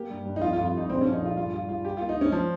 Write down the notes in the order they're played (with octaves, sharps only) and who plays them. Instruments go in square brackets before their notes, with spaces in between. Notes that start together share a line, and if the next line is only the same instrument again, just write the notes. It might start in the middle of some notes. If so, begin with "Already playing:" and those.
Already playing: [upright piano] A#3 [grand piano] G4
[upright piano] G2
G2
[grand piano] D#4
[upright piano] F2 [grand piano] F4
[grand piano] F4
[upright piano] F2
[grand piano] F4
[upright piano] G3 [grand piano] D#4
[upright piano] A#1 [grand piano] C4
[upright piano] F3 [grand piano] C#4
[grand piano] D#4
[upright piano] A#1 [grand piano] F4
[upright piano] G2 [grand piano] F4
[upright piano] G3 [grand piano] F4
[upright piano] G2 [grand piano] F4
[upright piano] G3 [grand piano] G4
[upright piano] A#3 [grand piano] F4
[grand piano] D#4
[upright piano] G3 [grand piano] C#4
[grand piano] F3